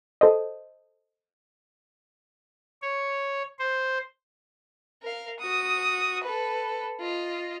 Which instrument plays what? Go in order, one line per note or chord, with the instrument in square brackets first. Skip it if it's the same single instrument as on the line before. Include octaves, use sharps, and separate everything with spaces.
[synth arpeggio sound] A4 C5 D#5
[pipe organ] C#5
C5
[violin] A#4 F5
F#4 D#6
A4 B4
F4 D#5